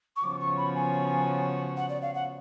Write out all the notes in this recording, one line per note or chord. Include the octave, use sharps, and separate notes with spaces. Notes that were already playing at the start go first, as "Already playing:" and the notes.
C#6
C#3 F3 B3 F#4 C#5 D6
C#6
B5
G#5
F#5
D5
F5
F#5